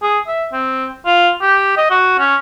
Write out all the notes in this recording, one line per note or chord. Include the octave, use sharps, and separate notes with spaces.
G#4
E5
C4
F4
G4
D#5
F#4
C#4